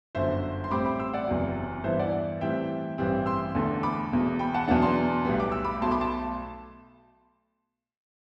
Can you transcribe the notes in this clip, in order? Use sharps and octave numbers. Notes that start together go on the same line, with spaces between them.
G1 F#2 D3 C5 E5
C6
A1 A2 G3 C4 B5 D6
B5 D6
C6 E6
D5 F#5
F#1 E2 C3 F#3
G2 E3 B3 E4 C5 E5
D5 F#5
A2 E3 G3 C4 E4 E5 G5
A1 G2 E3 G3 C4
C6 E6
E2 D3 A3
B5 D6
E1 E2 B2
G5 B5
F#5 A5
E2 B2 F#3 B3 D4 F#5 A5
A5 C6
B1 A2 G3 B3
D6
E6
B5 D6
B1 B2 A3 A5 C6
B5 D6
A5 C6